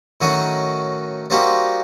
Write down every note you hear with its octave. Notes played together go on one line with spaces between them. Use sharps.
A2 D#3 F#3 C#4 D#4 F#4
G3 A#3 C4 D#4 F#4 G4